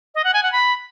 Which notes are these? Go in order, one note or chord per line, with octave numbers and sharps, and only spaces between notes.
D#5
F#5
G#5
F#5
B5